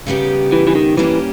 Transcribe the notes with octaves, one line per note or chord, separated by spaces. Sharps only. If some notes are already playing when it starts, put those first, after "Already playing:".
C#3 G3 B3 D#4 G4
E3
E3
D#3
E3 G3 A#3 C#4 G4